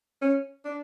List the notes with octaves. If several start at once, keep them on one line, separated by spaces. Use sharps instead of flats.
C#4
D4